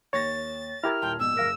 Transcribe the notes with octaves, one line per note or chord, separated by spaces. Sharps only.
D#2 C#5 A6 A#6
E4 G4 A#4 E6 F6 G#6 A#6
D#1 G5 A5 C6
A#1 G#2 B2 E6
F#1 A#4 F5 A#6